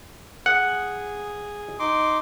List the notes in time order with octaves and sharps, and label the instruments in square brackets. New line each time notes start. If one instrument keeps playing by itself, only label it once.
[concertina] G#4 [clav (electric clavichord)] F#5
[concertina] D#4 C6 D6